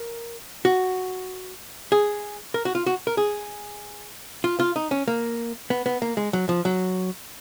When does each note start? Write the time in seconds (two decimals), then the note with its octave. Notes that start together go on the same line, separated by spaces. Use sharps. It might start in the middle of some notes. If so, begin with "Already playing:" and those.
Already playing: A#4
0.65 F#4
1.92 G#4
2.54 A#4
2.65 F#4
2.75 F4
2.86 F#4
3.07 A#4
3.17 G#4
4.44 F4
4.60 F4
4.76 D#4
4.91 C#4
5.08 A#3
5.70 B3
5.86 B3
6.02 A#3
6.17 G#3
6.33 F#3
6.49 F3
6.65 F#3